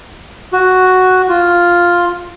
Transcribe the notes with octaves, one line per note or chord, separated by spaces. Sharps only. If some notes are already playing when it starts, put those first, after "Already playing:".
F#4
F4